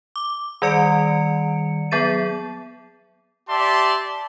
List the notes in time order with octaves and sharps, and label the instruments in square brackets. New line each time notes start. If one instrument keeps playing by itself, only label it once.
[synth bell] D6
D#3 G3 D5 C#7 D7
F#3 B3 G#4 A6 D#7
[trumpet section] G4 D5 E5 A5 C6